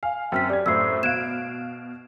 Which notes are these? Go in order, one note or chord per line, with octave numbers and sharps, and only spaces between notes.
F5 G#5
F#2 C4 G5 F6 B6
G4 D5 G#6
F#2 A2 C5 E6 C7
B2 F5 F#6 G#6 D7 E7